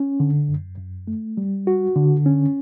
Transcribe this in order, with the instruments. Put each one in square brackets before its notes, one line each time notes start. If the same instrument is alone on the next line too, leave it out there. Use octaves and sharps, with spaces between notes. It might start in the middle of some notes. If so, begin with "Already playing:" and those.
Already playing: [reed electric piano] C#4
D3
F#2
F#2
A3
G3
F#4
D3
C#4